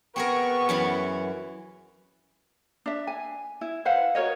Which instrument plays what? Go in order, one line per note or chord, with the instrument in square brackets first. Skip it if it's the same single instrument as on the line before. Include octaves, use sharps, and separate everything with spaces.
[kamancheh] B3 [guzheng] C4 G#4 A#4 [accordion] C#6
[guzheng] F#2 E3 B5
[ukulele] D4 E5
G#5
E4
B4 C5 F5 F#5
F#4 A#4 C#5 D#5